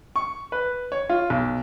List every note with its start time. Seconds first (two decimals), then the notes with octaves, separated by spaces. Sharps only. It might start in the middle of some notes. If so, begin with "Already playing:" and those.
0.16 C#6
0.52 B4
0.92 C#5
1.09 F4
1.30 B1